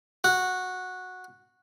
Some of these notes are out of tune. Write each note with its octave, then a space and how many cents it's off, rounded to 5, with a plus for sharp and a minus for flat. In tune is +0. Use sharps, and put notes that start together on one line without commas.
F#4 -10